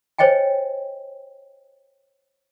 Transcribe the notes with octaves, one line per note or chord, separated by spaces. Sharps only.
C5 C#5 D#5 G5 G#5